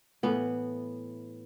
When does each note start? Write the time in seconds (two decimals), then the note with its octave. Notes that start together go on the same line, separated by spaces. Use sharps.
0.23 A2 E3 B3